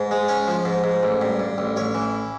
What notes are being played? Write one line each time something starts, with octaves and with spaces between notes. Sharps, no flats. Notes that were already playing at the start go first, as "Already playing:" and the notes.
Already playing: G#2
G#3
C#4 C#5
F3
G#2
G#2
A1
G2
G2
A1
A1 C#5
E3